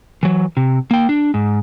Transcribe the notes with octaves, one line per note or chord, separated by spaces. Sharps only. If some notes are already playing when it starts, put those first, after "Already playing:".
E3 F#3
C3
A#3 G5
D4
G#2